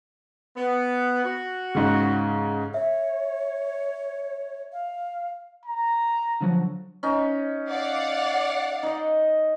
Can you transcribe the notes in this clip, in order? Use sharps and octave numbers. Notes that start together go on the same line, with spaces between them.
B3
F#4
G#2 C#3
C#5 E5
F5
A#5
D3 F3 F#3
C#4 D#4
D5 F5 F#5
D#4 D#5